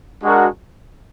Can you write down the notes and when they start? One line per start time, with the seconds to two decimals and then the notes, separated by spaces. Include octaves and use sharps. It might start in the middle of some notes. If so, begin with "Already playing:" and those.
0.22 G#3 D4 F#4 A#4